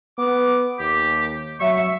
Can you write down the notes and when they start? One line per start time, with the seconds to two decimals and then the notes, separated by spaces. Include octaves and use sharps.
0.18 B3 D6
0.80 D#2 G4
1.60 F#3 E5 C#6